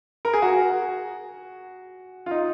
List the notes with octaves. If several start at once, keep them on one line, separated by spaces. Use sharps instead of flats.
A#4
G#4
F#4
F4
D#4